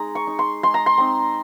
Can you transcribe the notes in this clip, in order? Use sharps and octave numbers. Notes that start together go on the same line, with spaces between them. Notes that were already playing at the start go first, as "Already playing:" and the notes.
Already playing: G#3 D#4 A#5
C#6
D#4
C6
G#3 C6
A#5
C6
C4 D#4